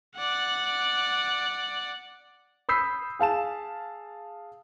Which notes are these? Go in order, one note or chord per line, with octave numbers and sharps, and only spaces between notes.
D5 F#5
B5 D#6 E6 G6 B6 C7
G#4 F5 A5 E7